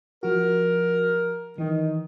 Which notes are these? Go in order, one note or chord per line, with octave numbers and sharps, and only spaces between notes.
F3 F#4 A#4
D#3 E3